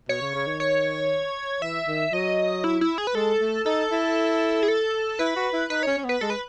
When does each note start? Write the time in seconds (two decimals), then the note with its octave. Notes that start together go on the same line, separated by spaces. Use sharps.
0.09 B2 C#5
0.21 C#3
0.35 C#3
0.47 D#3
0.60 C#5
1.62 E3 E5
1.88 D#3
2.13 F#3 D#5
2.64 E4
2.81 E4
2.98 G#4
3.07 B4
3.15 G#3 A4
3.41 A3
3.66 D#4 A4
3.91 E4
4.63 G#4
4.68 A4
5.19 E4 B4
5.36 F#4
5.53 E4
5.70 D#4 B4
5.83 C#4 C#5
5.98 C#4
6.04 B3 B4
6.21 G#3 A4
6.30 B4